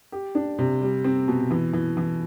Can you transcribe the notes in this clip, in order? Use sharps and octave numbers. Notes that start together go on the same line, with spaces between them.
G4
D4
C3
G3
C4
B2
E3
E3
E3